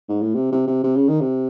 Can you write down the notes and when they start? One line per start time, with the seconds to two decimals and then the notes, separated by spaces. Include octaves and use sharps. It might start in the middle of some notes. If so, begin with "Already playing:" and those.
0.09 G#2
0.21 A2
0.35 C3
0.52 C3
0.67 C3
0.84 C3
0.96 C#3
1.08 D#3
1.21 C3